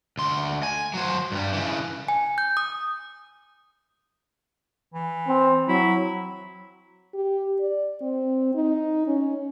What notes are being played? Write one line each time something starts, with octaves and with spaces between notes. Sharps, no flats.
D2 C6
G#5
F#3 C5
G2 G3
C#3 E3
G#5
G6
D#6
E3
C4
F#3 E4
G4
D5
C4
D#4
C#4